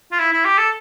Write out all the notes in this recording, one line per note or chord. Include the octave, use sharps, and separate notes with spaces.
F4
E4
E4
G4
A4